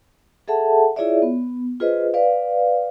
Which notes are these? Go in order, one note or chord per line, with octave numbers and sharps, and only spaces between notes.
G#4 A4 E5 F#5 A5
E4 F4 G#4 C#5 D5 E5
B3
F4 G#4 B4 C5 D#5
B4 D5 F5